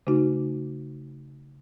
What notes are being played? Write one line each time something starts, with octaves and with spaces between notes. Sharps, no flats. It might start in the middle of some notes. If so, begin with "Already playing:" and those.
C#3 A3 D#4 F#4